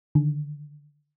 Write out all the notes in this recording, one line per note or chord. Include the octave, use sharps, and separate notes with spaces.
D3 D#3